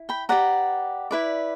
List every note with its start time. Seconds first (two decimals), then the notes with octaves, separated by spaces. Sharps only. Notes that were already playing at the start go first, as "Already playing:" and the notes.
Already playing: E4
0.09 G5 B5
0.29 G4 B4 D5 F#5 A#5
1.11 E4 B4 D5